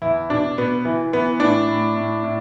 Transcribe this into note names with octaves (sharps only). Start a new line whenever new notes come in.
E2 E4
B2 D4
B2 B3
E3
E3 B3
A2 D4
A2
A2
A2